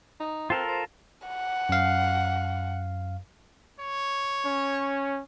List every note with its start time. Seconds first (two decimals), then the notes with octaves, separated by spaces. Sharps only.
0.20 D#4
0.50 C4 F4 A4 A#4
0.68 C5
1.28 F#5
1.69 F#2 F5
3.80 C#5
4.46 C#4